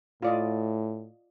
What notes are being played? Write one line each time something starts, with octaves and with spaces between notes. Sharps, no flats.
A2 F4 D5 D#5